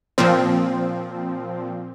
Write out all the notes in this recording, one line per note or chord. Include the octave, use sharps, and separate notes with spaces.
A#2 F3 C4